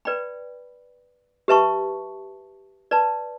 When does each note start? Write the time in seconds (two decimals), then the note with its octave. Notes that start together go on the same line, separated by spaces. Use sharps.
0.05 B4 D5 G5 B5
1.48 G4 B4 E5 A5 C#6
2.91 B4 D5 A5